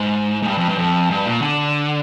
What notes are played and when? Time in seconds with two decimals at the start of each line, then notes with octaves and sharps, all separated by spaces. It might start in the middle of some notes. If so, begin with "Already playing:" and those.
Already playing: G#2
0.43 G#2
0.48 G2
0.58 F2
0.69 G2
0.78 F2
1.11 G2
1.26 A#2
1.42 D3